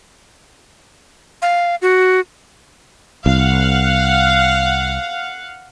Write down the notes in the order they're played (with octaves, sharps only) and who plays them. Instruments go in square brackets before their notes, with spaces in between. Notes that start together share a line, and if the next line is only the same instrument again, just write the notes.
[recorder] F5
F#4
[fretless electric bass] C2 [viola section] F5 F#5